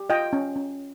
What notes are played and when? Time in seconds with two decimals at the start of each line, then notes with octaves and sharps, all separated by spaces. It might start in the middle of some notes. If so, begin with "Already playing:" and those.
Already playing: G4
0.10 F4 D#5 G5
0.33 C#4
0.56 C#4